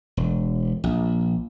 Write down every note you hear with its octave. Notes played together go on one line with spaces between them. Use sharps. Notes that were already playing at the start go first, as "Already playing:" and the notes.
E1
A#1